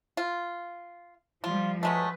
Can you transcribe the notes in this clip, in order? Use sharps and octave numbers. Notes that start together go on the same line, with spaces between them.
F4
F3 G3 F4
F#3 G#3 A3 B4